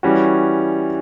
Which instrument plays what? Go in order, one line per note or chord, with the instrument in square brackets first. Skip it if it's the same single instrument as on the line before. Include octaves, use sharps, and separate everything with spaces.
[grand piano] E3 G3 C#4 F#4